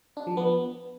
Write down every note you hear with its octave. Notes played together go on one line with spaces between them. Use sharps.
D4
F3
B3